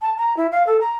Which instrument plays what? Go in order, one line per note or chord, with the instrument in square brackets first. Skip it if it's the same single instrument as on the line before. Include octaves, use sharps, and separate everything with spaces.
[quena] A5
A#5
E4
F5
A4
A#5